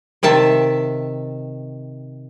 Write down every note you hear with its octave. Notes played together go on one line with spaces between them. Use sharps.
C3 D#3 E5 A5